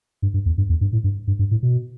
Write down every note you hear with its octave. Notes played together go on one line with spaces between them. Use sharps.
G2
G2
E2
G2
E2
G2
A2
G2
G2
G2
A2
B2